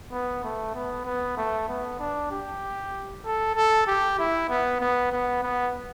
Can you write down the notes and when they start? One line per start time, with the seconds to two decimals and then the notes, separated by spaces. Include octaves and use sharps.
0.12 B3
0.44 A3
0.75 B3
1.06 B3
1.37 A3
1.69 B3
1.99 D4
2.32 G4
3.25 A4
3.56 A4
3.87 G4
4.19 E4
4.49 B3
4.81 B3
5.12 B3
5.43 B3